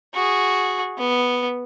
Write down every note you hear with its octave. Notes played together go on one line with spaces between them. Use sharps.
F#4 G#4
B3